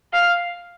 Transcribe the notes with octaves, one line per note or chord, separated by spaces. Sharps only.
F5